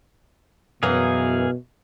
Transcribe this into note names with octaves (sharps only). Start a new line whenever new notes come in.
F#2 B2 E3 G#4 F5 A#5